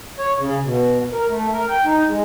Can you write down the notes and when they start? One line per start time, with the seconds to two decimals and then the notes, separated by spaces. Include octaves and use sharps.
0.19 C#5
0.39 C#3
0.64 B2
1.13 A#4
1.29 A3
1.53 A#4
1.68 G5
1.85 D#4
2.07 G#3